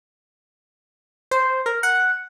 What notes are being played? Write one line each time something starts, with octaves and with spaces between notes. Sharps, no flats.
C5
A#4
F#5